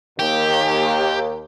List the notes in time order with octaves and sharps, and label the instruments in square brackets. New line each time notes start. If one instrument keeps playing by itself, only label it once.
[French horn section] D#2 [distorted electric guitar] G4